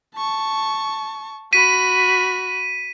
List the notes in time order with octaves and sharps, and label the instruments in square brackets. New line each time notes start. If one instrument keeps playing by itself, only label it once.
[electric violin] A5 C#6
[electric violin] F#4 B5 [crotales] B6 D#7